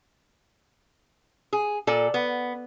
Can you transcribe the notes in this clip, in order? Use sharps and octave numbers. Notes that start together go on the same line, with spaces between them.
G#4
A#2 A4 D5
B3